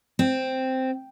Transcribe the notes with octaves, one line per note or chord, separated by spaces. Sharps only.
C4